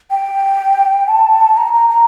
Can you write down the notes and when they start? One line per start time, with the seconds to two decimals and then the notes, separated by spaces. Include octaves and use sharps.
0.11 G5
1.08 A5
1.57 A#5
1.74 A#5
1.90 A#5